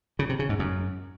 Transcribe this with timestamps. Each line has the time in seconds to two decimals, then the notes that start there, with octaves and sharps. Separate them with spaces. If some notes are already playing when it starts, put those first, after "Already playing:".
0.19 C#3
0.29 C3
0.39 C#3
0.49 G#2
0.59 F#2